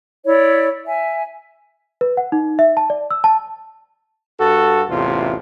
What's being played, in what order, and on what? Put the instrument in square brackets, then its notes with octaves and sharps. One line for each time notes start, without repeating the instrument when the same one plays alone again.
[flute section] E4 C#5 D5
E5 G#5
[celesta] B4
F#5
D#4
E5
A5
D5
E6
A5
[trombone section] G2 F#4 A4
A1 E2 C3 F4